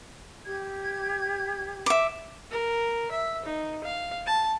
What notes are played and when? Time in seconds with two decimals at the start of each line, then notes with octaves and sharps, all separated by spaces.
0.45 G4 G#6
1.86 E5 D6
2.51 A#4
3.11 E5
3.45 D#4
3.84 F5
4.26 A5